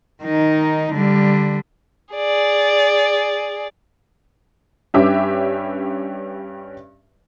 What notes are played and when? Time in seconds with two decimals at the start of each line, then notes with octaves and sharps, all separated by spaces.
0.23 D#3 D#4
0.93 D3 G3
2.15 G#4 D5
4.94 G2 C#4 G4 B4 E5 D6